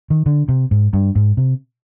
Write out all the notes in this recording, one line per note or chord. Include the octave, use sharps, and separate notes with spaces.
D#3
D3
C3
G#2
G2
G#2
C3